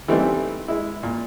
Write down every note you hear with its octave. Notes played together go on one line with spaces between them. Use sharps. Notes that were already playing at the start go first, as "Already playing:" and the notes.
E3 G3 A3 C4 D#4
G#3 E4
A#2